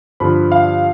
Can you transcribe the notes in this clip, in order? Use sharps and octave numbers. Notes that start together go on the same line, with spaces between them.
G2 D3 F3 B5
F5